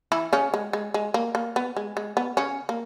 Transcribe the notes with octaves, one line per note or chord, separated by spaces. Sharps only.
E3 E4
C#3 C#4
G#3
G#3
G#3
A#3
A#3
B3
G#3
G#3
B3
C#3 C#4
A#3